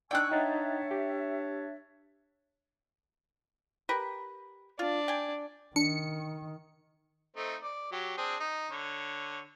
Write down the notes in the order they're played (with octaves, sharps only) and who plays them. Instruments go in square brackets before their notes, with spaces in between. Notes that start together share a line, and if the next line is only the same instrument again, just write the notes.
[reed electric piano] D4 D#4 D5 [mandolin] G5 F#6 [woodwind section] G#5 C#6 E6
[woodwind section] D4 C#5 E5 [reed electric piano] D#4 F#5 A6
[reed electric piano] G4
[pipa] G4 A#4 B4
[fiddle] D4 [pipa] F4
[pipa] G5 G#5
[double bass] D#3 [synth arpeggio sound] D4 [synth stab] C#7
[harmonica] A3 C4 D#4
D5
F#3 G4
C4 D4 G#4
D#4
D3 C#5